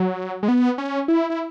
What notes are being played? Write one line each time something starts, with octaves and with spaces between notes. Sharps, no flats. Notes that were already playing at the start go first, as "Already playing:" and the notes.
Already playing: F#3
G#3
B3
C#4
E4
E4